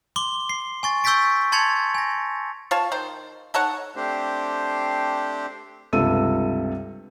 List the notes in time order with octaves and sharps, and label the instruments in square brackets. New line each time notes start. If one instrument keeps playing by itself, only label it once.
[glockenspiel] C6 D6 G7
C7
G#5 C#6 A6
C#6 E6 G6 A6 B6 D7
A5 C6 G#6 A6 C#7 F7
G#5 A#6
[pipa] F4 C#5 F5 A5
D#3 C5
D#4 A4 C#5 F#5
[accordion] A3 C4 D4 G4 C5
[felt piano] C#2 G2 C3 A4 E6 D#7